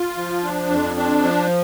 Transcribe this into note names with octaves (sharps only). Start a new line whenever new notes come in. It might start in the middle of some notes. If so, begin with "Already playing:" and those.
Already playing: F4
F3
D4
F2
D4
F3